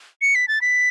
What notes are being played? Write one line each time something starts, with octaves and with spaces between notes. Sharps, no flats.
C#7
B6
A6
B6